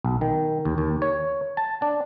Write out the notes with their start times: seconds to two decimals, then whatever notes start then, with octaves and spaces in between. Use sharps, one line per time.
0.04 B1
0.21 D#3
0.65 D#2
0.78 D#2
1.02 C#5
1.57 A5
1.82 D4